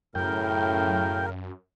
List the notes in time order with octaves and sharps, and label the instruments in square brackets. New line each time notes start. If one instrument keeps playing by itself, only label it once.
[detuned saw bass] F#2 [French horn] A2 [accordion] C#3 A#4 [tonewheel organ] G5